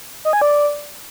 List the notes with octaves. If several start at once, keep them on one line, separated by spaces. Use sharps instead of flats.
D#5
G#5
D5